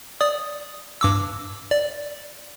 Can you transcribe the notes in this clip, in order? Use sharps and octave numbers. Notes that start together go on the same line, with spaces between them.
D5 D#6
G2 D6 E6
D5